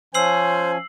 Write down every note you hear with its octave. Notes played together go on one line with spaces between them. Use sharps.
F3 C#4 C5 G#5 E6 C7 F#7